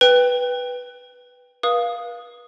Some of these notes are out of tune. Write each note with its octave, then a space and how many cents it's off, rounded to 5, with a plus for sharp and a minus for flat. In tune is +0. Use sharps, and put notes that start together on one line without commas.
B4 +0 G5 +10
B4 -40 F5 +0 D#6 +0